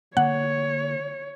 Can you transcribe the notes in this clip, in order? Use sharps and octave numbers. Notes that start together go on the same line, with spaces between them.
D3 A#3 C#5 F#5